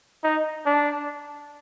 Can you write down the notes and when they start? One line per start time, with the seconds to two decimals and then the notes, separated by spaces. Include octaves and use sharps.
0.24 D#4
0.66 D4